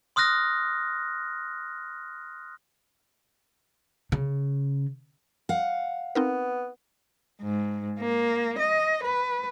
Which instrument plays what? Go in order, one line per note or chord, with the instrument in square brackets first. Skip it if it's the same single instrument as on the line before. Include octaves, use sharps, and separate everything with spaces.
[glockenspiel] C6 D#6 F6 F#6 A#6
[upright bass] C#3
[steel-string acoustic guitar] F5 F#5
[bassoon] B3 [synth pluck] C4 D#4 A#4
[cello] G#2
A#3
D#5
B4